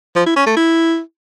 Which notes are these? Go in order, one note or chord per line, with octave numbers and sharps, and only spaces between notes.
F3
E4
C#4
A3
E4